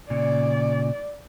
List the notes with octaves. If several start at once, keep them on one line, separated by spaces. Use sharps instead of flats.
A#2 C#3 D5